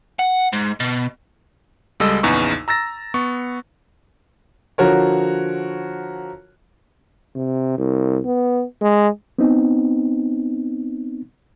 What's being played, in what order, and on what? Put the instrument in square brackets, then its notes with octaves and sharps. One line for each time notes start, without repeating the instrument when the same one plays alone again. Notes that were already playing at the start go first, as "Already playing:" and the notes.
[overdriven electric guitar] F#5
G#2
B2
[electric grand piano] C#2 G3 G#3 A4 D#5 E6
A#1 E2 C#3 D#4 B4 C#6
A#5 E6 A6 A#6
B3 C#6
[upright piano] D3 F3 F#4 A#4 C#5
[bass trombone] C3
C2
B3
G#3
[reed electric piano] B3 C4 D#4